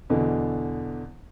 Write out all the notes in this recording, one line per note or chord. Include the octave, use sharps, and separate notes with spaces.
E2 B2 D3